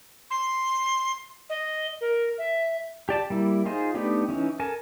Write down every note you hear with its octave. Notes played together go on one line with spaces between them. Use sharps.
C6
D#5
A#4
E5
G4 D5 A5
G3 A#3 E4
D#4 F4 G#4 C5 D#5
A3 B3 D4 D#4 G4
E3 C#4 D#4
A4 A#4 G#5 A5